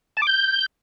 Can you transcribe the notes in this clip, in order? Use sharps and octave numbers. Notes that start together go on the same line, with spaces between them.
A5
D6
G6